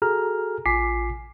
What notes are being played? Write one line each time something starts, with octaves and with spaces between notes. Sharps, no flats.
F#4 G#4 A4 A#5 F6
A1 F4 G#5 D6 B6 C7